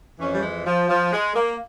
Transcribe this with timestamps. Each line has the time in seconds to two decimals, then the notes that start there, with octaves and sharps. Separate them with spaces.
0.19 F2 E3 C#4
0.34 G3
0.43 G#3
0.66 F3
0.89 F3
1.13 G#3
1.34 A#3